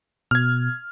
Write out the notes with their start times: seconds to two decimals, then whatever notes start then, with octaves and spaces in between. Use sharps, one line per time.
0.31 B2 F6 G#6